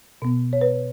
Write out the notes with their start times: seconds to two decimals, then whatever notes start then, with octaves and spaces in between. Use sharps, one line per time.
0.22 B2 B3
0.53 C#5
0.61 B4